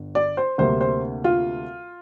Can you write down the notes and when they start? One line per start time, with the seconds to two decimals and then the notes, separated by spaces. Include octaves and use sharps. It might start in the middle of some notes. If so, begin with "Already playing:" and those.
Already playing: G1
0.15 D5
0.37 C5
0.58 D2 C3 G3 A#3 C5
0.81 C5
1.24 F4